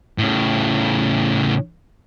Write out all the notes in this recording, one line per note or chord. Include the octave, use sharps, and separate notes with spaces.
A2 C#3